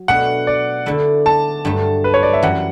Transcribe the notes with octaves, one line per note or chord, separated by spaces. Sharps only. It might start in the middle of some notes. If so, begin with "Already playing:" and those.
Already playing: F#3
B2 A3 D4 F#5
D5
D3 A3 E4
A5
G2 F#3 A3
B4
C#5
D5
E5
F#2 E3 G3 F#5